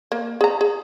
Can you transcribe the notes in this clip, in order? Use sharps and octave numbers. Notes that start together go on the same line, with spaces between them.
A#3
G#4 A#5
G#4